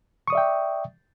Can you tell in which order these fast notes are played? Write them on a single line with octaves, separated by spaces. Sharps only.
C#6 D#6 D5 E5 G5